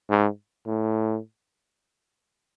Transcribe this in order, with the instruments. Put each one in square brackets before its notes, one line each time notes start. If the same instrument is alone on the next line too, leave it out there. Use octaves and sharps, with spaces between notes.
[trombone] G#2
A2